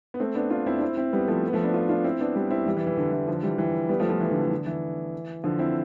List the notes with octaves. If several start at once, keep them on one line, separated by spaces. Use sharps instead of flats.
B3
A3 C4
B3 D4
D4 F4
C4 E4
D4
C4 E4
C4 E4
G3 B3
F3 A3
B3
F3 A3
B3 D4
D4 F4
D4 F4
C4 E4
B3 D4
G3 B3
C4 E4
E3 G3
E3
E3
D3
E3
D3 F3
E3 G3
E3 G3
G3 B3
F3 A3
F3 A3
E3
D3
E3
D3
E3
D3 F3
C4 E4